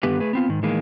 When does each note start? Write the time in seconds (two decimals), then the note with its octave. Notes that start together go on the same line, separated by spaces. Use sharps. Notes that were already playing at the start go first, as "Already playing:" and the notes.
0.03 G2 D3 D#3 B3 G4 B4
0.20 A3 G#4 B4
0.33 B3 C4 F4
0.48 G#2 D#3
0.63 A2 D#3 E3 G#3 A#3